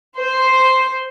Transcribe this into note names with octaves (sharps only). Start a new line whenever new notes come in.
C5